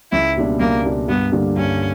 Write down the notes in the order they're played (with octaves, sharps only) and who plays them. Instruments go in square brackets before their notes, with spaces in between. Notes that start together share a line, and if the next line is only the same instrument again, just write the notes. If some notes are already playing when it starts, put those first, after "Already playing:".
[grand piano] C#2 [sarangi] E4
[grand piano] B2 G3 A#3 D4
[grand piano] C#2 [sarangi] A#3
[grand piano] B2 G3 A#3 D4
[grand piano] G2 [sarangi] B3
[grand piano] D3 G3 A#3 D4
[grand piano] G2 [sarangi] C#4